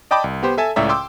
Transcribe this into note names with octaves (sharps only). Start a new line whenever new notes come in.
D5 D#5 G5 A5 B5 D6
C2
B3 G4 C5
A4 E5 G#5 A5
C#2 A2 C#4 D5 E5 A#5
G5 C6 D6 E6